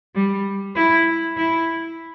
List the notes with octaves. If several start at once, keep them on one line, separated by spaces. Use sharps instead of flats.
G3
E4
E4